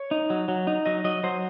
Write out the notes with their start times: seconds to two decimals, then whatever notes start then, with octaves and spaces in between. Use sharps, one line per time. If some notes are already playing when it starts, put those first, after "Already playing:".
Already playing: C#5
0.11 D#4
0.30 F#3
0.48 F#3
0.67 D#4
0.86 F#3 D#5
1.04 F#3 D#5
1.23 F#3 C5